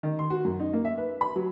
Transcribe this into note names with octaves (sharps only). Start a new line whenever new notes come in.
D#3
C6
F#4
F#2
D#4
A#3
E5
B4
B5
F#3